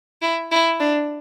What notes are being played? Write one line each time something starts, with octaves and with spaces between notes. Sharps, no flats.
E4
E4
D4